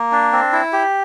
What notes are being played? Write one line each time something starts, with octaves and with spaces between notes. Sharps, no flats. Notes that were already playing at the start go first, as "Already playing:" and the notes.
Already playing: A#3
D4
C4
E4
G4